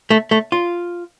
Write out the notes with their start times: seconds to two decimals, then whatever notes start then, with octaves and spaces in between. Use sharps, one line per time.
0.10 A3
0.31 A3
0.52 F4